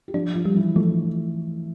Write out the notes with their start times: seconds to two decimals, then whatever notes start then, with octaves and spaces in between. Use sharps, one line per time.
0.08 G4
0.14 F3 D4 F4
0.35 F3 F4
0.45 G3
0.55 E3 E4
0.76 F3 A3